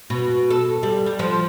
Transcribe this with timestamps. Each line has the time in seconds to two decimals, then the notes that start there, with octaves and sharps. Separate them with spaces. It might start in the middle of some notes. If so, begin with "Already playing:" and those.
0.10 B2
0.50 A4
0.83 G3
1.06 G3
1.19 F3